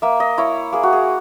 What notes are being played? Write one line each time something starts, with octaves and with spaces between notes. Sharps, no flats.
A#3 E5
D#5
E4 C#5
A#3 G#4
F#4
G#4